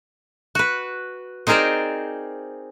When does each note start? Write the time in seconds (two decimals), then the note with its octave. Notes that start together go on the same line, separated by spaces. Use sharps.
0.55 F#4 B4
1.47 C4 D#4 G#4 A#4 C5 D5